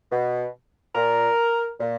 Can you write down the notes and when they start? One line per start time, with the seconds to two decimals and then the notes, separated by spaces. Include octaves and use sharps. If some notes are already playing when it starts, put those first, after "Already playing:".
0.12 B2
0.95 A#2 A#4
1.80 A#2